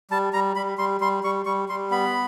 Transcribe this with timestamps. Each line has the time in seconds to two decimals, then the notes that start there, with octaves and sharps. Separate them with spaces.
0.11 G3 A5
0.33 G3 A#5
0.56 G3 B5
0.78 G3 C6
1.01 G3 C6
1.24 G3 C#6
1.46 G3 C#6
1.69 G3 C6
1.91 B3 B5